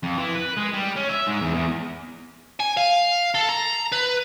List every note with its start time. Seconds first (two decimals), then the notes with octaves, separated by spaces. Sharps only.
0.03 F2
0.18 E3
0.35 B4
0.57 G#3
0.73 G3
0.96 C#4
1.09 E5
1.27 G#2
1.41 E2
1.55 E2
2.60 G#5
2.77 F5
3.35 A4
3.49 A#5
3.92 B4